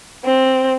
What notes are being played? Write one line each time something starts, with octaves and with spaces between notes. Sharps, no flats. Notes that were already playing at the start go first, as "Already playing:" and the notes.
C4